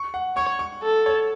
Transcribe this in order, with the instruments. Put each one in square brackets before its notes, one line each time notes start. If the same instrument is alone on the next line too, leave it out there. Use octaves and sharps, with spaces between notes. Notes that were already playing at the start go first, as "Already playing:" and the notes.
Already playing: [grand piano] C#6
F#5
[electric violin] C#5 [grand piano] C#6
[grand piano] C#6
[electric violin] A4
[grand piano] C#5